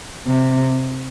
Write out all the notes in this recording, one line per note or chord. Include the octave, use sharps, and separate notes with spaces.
C3